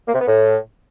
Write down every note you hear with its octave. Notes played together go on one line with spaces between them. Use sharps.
A#3
C3
B3
A2